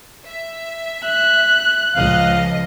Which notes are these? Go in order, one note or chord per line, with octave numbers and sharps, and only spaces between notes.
E5
F#6
C#2 F3 D#5 F5